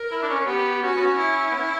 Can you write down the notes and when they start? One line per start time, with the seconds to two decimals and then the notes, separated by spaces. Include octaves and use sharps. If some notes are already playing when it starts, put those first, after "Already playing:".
Already playing: A#4
0.11 E4
0.22 D4
0.29 C#4
0.41 C#4
0.46 B3 G4
0.82 C#4 F#4
0.97 B3
1.00 C#4
1.18 E4
1.51 B3
1.55 C#4